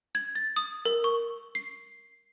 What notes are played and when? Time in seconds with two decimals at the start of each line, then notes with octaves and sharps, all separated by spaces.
0.15 G#6
0.35 A6
0.56 D#6
0.85 A#4
1.04 C#6
1.55 C7